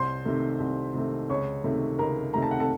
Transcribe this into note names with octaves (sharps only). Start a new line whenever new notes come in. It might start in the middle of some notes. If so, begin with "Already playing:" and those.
Already playing: C2 C5 C6
C3 D#3 A3
C2
C3 D#3 A3
C#2 C#5 C#6
C3 D#3 A3
C#2 A#4 A#5
C3 D#3 A3 A#5
A5
F#5
A4 A5